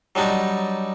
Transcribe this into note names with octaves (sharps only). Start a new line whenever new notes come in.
F#3 G3 D4 D#4